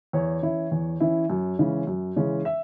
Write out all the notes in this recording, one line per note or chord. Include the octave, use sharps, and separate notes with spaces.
E2 C#5
E3 C#4 E4
E2
E3 C#4 E4
F#2
C#3 E3 G#3 C#4
F#2
C#3 E3 G#3 C#4
E5